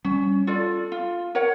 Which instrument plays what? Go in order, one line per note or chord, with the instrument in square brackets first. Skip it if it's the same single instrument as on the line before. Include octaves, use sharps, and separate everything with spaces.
[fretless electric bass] G3 [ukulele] C#4
[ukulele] F4 A4 D5
F4
A#4 C#5 F#5